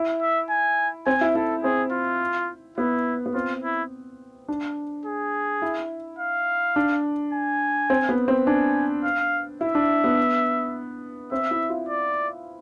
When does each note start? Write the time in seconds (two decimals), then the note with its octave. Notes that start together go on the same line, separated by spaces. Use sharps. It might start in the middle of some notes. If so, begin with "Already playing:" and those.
Already playing: E4
0.21 E5
0.50 G#5
1.06 C4 G#5
1.21 E4
1.35 E4 A4
1.63 C4 G#4
1.92 F4
2.77 B3 E4
3.26 B3
3.34 C4 F4
3.63 E4
4.48 D4
5.06 G#4
5.62 E4
6.19 F5
6.76 D4
7.34 G#5
7.90 C4
8.09 B3
8.28 C4
8.47 D4 G#5
9.04 F5
9.61 E4 E5
9.75 D4
10.04 B3
11.32 C4 E5
11.51 E4
11.70 F4
11.89 D5